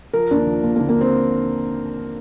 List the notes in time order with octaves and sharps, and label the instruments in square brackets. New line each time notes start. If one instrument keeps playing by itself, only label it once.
[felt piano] F3 A#4
D#2 D4
F3
F3 A#3
A#3
D3
A#3
C4